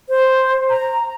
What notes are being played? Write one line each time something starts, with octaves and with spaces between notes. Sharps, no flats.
C5
A#5